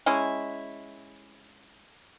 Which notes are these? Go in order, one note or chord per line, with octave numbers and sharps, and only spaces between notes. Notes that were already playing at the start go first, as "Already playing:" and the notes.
G#3 C#4 E4